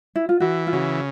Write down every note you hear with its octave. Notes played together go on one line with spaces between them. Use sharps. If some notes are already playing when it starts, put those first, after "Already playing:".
E4
F4
E3 F#4
F4
C#3 F#4